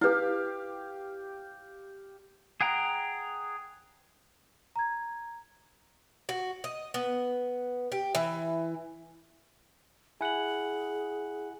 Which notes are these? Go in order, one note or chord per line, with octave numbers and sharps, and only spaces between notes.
E4 G4 B4 F5
G#4 F#5 G5 A#5
A#5 G#6
F#4
D#5
B3
G4
E3
E4 G#4 F#5 G#5 F#7